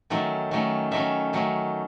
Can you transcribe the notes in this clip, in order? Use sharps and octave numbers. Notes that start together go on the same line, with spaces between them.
D#3 F#3 A3 C#4
D#3 F#3 A3 C#4
D#3 F#3 A3 C#4 E5
D#3 F#3 A3 C#4